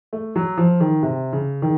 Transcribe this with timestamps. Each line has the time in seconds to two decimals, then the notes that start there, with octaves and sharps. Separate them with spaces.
0.13 A3
0.36 F#3
0.57 F3
0.80 D#3
1.03 C3
1.33 C#3
1.62 D#3